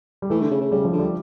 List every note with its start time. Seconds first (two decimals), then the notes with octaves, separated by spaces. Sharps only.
0.22 G3
0.30 E3 A3
0.41 D3
0.50 C#3
0.61 C#3
0.71 C#3 G3
0.84 F3
0.92 D3
0.99 G3